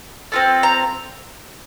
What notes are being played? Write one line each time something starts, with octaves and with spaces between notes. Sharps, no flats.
C4 F4 A4
A#5